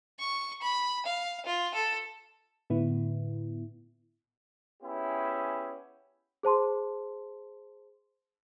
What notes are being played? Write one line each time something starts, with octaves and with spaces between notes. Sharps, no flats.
C#6
B5
F5
F4
A4
A2 D3 B3 E4
B3 C#4 E4 G4 G#4
G#4 C5 A5 C6